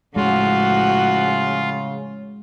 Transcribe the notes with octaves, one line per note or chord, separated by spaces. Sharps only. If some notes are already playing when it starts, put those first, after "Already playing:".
A2 C#3 F3 G#3 F4 F#4